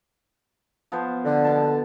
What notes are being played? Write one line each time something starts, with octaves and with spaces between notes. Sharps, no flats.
F3 B3 C5
D3
B2 A5